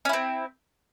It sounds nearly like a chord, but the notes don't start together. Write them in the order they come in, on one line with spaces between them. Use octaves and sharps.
C#4 E4 C4